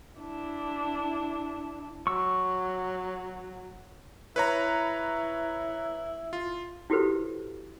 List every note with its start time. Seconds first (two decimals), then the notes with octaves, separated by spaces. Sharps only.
0.20 D4 E4
2.07 F#3 C#6 E6
4.36 E4 B4 C#5 A#5
6.33 F4
6.90 E4 F#4 G4 A4 B4 C5